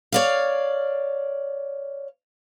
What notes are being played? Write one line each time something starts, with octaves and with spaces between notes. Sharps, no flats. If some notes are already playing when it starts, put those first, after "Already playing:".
C#5 D5 F5